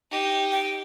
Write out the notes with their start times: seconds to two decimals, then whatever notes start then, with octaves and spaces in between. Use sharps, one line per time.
0.11 D#4 G4
0.52 G5